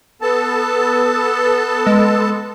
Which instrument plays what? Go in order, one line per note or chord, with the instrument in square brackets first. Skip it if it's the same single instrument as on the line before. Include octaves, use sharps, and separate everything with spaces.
[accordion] B3 A4 A5
[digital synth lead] G#3